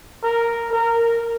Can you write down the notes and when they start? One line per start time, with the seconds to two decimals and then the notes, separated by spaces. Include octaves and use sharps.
0.23 A#4
0.73 A#4